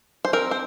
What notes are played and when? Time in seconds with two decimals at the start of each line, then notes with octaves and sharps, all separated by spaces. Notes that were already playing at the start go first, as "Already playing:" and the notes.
0.25 C5
0.33 C4 A#4
0.51 C5